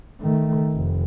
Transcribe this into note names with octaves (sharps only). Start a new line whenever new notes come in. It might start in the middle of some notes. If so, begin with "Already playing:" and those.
D#3 A3
F1